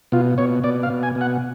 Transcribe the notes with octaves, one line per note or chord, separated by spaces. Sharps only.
B2 F4
B2 C#5
B2 D5
F5
B2
G#5
B2
F#5